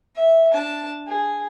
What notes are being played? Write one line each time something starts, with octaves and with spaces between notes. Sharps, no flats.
E5
D4 A5
G#4